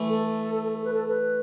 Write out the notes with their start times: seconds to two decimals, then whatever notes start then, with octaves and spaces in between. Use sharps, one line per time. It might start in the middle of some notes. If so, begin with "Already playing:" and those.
Already playing: E3 A3
0.09 A4
0.75 A4
0.84 B4
0.93 A4
1.08 B4